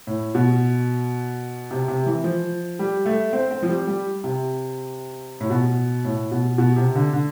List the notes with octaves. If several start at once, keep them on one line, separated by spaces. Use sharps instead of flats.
A2
B2
C3
C3
E3
F3
G3
A3
C4
C4
F3
G3
G3
C3
A2
B2
A2
B2
B2
C3
D3
D3